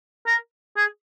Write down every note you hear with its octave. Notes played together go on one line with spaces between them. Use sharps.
A#4
G#4